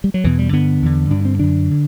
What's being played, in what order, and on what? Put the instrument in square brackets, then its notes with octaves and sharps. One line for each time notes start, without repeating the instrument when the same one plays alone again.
[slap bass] G3
F#3
E2 B2 E3
G3
G2 D3 B3
E2 D3
G2 D3 D4
C4
F#2 D3 D4
D3